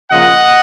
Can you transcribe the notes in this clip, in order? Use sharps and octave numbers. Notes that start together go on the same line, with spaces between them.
C#3 F3 A#3 F4 D#5 F#5